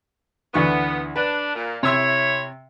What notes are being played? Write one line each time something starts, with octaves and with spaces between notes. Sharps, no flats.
D2 E3 B3 C#6
D4 B4
A#2
C3 E4 C#5 C6 E6